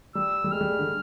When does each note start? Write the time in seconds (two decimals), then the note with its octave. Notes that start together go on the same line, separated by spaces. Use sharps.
0.15 G3 E6
0.44 G3
0.52 G#3 F6
0.61 G3
0.71 G#3
0.79 D3